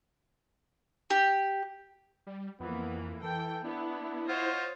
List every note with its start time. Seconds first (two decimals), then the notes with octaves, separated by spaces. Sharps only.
1.10 G4
2.27 G3
2.60 F2 E3 A#3 B3
3.23 E3 A4 G5
3.64 B3 D4 E4
4.29 F4 C5 C#5 D#5 F#5